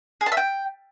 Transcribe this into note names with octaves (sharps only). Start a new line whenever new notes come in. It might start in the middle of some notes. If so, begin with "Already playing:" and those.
G#4
A5
E5
G5